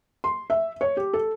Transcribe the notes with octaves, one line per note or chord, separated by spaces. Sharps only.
C6
E5
C#5
G4
A4